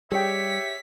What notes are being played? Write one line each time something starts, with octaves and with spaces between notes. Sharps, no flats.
G3 G4 G#4 C#5 D5 E5 G5 B6